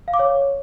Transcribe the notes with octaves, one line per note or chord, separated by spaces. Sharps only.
F5
D6
C#5